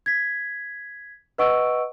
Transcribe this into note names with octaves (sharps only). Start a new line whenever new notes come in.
G#6 B6
B4 D#5 F#5 C#6 E6 D7